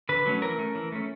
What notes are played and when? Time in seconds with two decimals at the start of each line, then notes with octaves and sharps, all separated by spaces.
0.09 D3 B4
0.26 F#3 A3 C#4
0.42 E3 A#4
0.58 A3 C#4
0.75 E3
0.92 A3 C#4